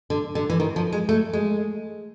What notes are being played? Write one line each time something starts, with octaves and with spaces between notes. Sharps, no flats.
D3
D3
E3
D#3
F3
G#3
A3
G#3